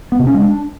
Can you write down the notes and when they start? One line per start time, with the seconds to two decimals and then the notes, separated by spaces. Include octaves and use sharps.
0.12 B3
0.19 C3
0.27 C#4
0.34 G#3
0.42 D4